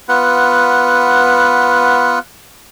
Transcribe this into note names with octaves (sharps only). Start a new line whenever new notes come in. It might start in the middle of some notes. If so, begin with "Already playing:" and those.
B3 F4 B4 F#5